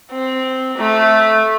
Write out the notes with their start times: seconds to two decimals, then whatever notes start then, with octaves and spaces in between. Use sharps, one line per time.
0.11 C4
0.77 A3